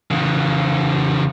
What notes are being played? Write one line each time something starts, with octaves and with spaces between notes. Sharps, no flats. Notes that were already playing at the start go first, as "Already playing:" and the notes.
C#3 E3